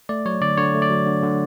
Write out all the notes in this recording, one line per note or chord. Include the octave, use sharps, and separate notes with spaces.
A3 D5
F#3 C#5
D3 D5
D3 C#5
A3
D5
F#3
D3
D3